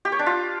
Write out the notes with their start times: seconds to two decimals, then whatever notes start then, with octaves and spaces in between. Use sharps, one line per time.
0.05 G4
0.12 C#5
0.19 D4
0.26 F4